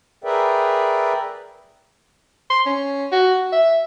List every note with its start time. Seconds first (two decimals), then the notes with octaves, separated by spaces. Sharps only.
0.24 G#4 A#4 B4 D5 E5 G5
2.50 C6
2.66 C#4
3.12 F#4
3.53 E5